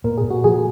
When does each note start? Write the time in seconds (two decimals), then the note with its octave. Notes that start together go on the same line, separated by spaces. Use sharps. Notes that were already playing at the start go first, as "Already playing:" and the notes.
0.04 A#2 A#4
0.18 G#4
0.24 A#2
0.30 F#4
0.44 F3 G#4